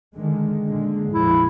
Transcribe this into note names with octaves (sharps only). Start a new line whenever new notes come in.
D3 D#3 G#3
A#2 D3 G#3
A#1 F2 F3 E4